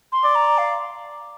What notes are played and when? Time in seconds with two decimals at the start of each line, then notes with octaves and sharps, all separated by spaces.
0.12 C6
0.24 D5
0.35 A#5
0.58 F5